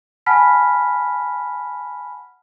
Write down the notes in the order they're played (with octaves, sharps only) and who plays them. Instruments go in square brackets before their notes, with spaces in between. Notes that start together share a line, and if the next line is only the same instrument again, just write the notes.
[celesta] F#5 G#5 A5 B5 F6 B6